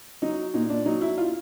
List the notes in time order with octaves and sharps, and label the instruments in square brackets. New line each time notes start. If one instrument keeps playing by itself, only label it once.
[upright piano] F#3 D#4
A#2 D#4
D4
F#3 D#4
E4
F4